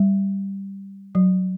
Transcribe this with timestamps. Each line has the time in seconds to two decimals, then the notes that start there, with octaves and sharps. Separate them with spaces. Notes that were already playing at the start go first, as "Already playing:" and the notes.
Already playing: G3
1.15 F#3